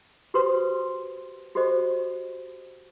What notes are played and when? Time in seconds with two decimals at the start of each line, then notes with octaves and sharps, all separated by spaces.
0.34 F#4 G4 B4 C5 C6 D#6
1.55 F#4 G4 A4 C5 D#5